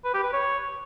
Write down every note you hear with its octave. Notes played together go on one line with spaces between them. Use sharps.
B4
G4
B4
C#5